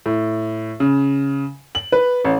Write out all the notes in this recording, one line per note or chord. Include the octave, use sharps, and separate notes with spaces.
A2
C#3
F#7
B4
A1